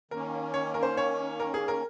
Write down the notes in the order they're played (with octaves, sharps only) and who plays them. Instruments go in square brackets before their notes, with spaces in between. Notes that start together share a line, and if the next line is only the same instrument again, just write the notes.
[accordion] D#3 A#3 C#4 [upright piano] A#4
[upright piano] C#5
A#4
C5
C#5
A#4
G#4
A#4